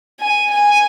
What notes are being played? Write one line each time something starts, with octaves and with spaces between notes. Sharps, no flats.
G#5
G#5